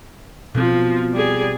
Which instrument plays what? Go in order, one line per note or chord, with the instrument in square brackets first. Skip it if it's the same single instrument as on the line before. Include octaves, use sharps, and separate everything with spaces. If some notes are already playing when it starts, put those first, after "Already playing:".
[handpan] B2 C4 [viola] F3
[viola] G3 G#4